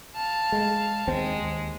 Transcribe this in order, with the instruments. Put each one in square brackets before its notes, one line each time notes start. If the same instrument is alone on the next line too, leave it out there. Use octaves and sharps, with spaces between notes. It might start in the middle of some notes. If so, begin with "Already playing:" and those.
[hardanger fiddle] F5 A5
[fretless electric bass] G#3
[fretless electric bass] D#2 C4 [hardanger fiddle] G#3
[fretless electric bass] D#2